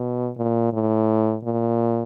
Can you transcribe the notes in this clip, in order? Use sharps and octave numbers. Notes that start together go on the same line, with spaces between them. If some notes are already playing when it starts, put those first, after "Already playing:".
Already playing: B2
A#2
A2
A#2